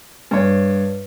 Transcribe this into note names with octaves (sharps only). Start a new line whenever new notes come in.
G2 C#5